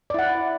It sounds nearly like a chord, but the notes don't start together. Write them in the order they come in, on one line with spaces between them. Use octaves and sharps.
D5 E4 F#5